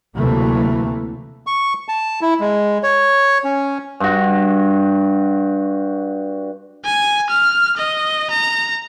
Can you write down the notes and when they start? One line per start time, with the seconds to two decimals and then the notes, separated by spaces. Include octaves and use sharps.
0.16 D2 C3 E3 F#3 A3 A#3
1.47 C#6
1.88 A5
2.22 E4
2.40 G#3
2.83 C#5
3.44 C#4
4.00 G2 F#4
6.85 G#5
7.30 F6
7.77 D#5
8.31 A#5